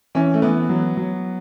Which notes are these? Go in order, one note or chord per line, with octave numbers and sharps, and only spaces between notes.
E3 C#4
A3
E3 B3
F#3
F#3